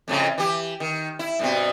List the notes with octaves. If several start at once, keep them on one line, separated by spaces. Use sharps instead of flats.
F2 A2 C#3
E3 G4
D#3
E4
G2 B2 C4